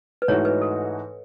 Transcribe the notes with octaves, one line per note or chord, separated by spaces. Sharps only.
B4
G#2 E3 A3 D#4 F#4 C#5
B4
A4